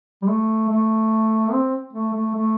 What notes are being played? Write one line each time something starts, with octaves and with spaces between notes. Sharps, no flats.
G3
A3
A3
C4
A3
A3
A3